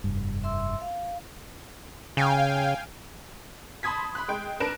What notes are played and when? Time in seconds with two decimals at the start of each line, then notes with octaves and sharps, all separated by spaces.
0.04 F1 G2
0.43 E5 C6 E6
0.81 F5
2.17 C#3 F5 G5 G#5
3.83 A5 B5 C6 D#6 G#6 B6
4.15 B5 C6 F#6
4.28 G#3 G5
4.60 D4 A#4 B4 F#6 D7 E7